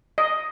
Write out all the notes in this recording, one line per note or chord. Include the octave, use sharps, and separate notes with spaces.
D#5